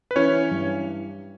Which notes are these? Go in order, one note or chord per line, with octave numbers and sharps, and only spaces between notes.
B4
E3 C#4 C#5
G2